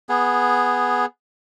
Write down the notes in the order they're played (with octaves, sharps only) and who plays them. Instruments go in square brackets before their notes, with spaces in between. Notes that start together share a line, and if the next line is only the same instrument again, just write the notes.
[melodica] B3 G#4